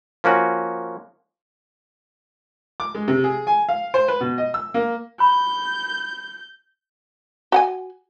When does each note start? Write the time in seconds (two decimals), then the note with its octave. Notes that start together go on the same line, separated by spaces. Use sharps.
0.24 F3 A#3 C#4 F#4
2.80 D6
2.95 G#3
3.08 C3
3.24 G#4
3.47 G#5
3.69 F5
3.94 C5
4.08 B4
4.21 B2
4.38 D#5
4.54 E6
4.74 A#3
5.20 B5 G6
7.52 F#4 F#5 G#5